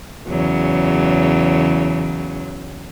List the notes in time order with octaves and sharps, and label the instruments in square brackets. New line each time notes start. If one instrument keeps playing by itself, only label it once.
[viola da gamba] E2 C#3 F#3